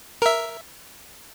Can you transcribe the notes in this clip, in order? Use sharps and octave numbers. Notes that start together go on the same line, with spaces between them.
A#4 E5